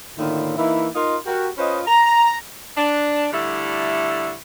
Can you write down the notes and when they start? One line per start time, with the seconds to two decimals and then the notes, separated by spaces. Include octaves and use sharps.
0.17 A2 D3 D#3 A#3 E4 F4
0.57 E3 A#3 D#4 E4
0.94 D#4 F4 A#4 D#5 F5 C6
1.26 F#4 G4 A#4
1.58 C#4 F4 B4 C5 D#5
1.87 A#5
2.77 D4
3.33 D3 G3 A3 E4